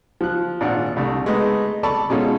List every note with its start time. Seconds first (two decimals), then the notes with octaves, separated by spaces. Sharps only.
0.21 F3 F#6
0.61 G#1 A#2 D4 F4 F#5
0.96 C2 A3 D4
1.26 G#3 A3 B3 D#4 D#5
1.83 A4 D5 A5 B5 C#6 E6
2.10 B2 G#3 C#4 D#4 F4 A4